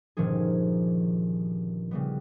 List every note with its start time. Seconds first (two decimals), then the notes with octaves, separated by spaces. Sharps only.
0.17 G1 A#2 D#3 F3 C#4 G#4
1.91 C#3 G3 B3